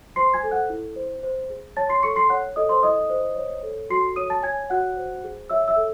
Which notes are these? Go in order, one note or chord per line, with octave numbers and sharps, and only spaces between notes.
C5 C6 C7
G#5 G#6
A4
F#5 F#6
E4
C5
C5
G#4
C#5 A5 A6
C6 C7
A4 C#6 C#7
C6 C7
C#5 F#5 F#6
A4 D#5 D#6
C5 C6
E4 D#5 D#6
C5
C#5
A4
F#4 C6 C7
C#5 D#6 D#7
A5 A6
C#5 G#5 G#6
F#4 F#5 F#6
C5
G#4
C#5 E5 E6
E5 E6
A4